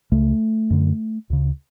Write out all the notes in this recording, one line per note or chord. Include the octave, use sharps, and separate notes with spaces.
C#2 C#3 A3
F#2 D3
D2 C#3